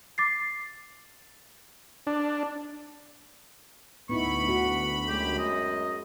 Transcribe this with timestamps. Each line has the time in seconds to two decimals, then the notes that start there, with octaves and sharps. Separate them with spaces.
0.18 D6 A6 C7
2.07 D4
4.09 D2 B3 D#4 E4 B5 C#6
4.48 B3 F#4
5.08 F#2 F#3 G#3 G4
5.39 D#5